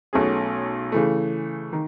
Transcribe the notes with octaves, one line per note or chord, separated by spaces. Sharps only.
B1 B2 A3 C#4 G#4
C#3 E3 A3
D#3